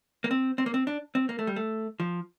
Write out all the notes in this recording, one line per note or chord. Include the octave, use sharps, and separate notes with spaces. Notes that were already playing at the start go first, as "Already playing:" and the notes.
A#3
C4
C4
A#3
C4
D4
C4
A#3
A3
G3
A3
F3